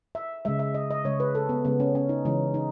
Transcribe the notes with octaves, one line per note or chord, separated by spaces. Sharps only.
E5
C#3 G#3 E5
E5
D#5
D#5
C#3 G#3 C#5
B4
A4
B3
C#3 G#3 B3
C#4
C#4
D#4
C#3 E3 G#3 C#4
D#4